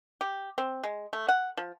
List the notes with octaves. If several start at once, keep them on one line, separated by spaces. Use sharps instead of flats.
G4
C4
G#3
A3
F#5
F3